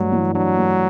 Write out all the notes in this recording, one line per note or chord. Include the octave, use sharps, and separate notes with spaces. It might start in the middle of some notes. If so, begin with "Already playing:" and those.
Already playing: G2 F#3 A3 D4
E3
F#3 D4
A3